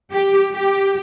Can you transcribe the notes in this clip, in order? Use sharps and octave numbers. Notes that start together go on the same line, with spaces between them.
G4
G4